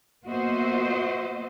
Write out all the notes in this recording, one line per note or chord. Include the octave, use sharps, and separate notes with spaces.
A#3 B3 F#4 C5 D#5 E5